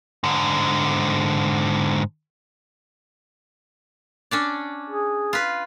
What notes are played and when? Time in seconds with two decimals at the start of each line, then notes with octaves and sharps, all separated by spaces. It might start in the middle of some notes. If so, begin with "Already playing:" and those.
0.24 G#2 D3
4.31 C#4 D4 D5
4.90 G#4
5.33 F4 B4